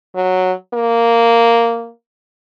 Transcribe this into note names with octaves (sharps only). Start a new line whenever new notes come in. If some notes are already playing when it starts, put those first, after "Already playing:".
F#3
A#3